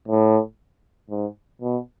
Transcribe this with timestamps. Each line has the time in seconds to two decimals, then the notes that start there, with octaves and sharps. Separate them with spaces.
0.08 A2
1.10 G#2
1.61 B2